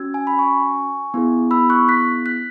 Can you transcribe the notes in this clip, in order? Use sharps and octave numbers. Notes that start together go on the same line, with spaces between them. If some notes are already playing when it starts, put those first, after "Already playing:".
Already playing: C#4 F#4 E6 G#6
G#5
B5
G#5 C#6
B3 E4 G#4
B5 E6
C#6 F#6
F#6 B6
F#6 B6